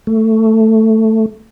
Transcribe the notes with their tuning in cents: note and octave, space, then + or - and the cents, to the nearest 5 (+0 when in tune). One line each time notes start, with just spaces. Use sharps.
A3 +10